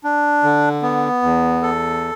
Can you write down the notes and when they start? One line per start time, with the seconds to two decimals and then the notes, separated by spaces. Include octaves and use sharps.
0.04 D4
0.43 D3
0.82 B3
1.22 E2
1.62 A4